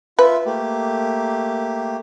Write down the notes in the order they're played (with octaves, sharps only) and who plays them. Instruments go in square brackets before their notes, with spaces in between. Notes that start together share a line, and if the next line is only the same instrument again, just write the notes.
[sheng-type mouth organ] F4 E5 [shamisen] B4
[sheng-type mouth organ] A3 A#3 G4